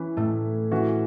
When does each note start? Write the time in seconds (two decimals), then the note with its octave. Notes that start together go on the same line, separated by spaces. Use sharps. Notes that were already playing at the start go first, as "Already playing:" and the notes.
Already playing: E3 C#4 E4 B4
0.17 A2 A3
0.71 E3 C#4 F#4